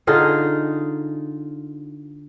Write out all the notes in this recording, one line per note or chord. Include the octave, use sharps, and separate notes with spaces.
D3 D#4 F4 G#4